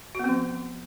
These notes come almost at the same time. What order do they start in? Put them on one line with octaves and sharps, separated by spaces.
F#4 B3 C4 F3